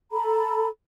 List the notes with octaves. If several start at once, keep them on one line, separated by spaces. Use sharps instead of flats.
A4 A#5 B5